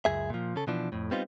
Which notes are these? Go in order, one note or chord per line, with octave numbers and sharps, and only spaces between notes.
C#2 F#2 G#4 E5
A#2 F3
C#3 A4
B2 E3 F3 D4
F2 A2
G3 B3 C4 D#4 F4